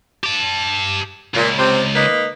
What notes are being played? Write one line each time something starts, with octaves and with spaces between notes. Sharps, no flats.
G4 A5
C#2 A#2
C3 C4
A#3 D#4 B4